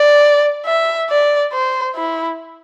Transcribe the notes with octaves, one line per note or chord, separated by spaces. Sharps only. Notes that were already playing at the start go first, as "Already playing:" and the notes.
Already playing: D5
E5
D5
C5
E4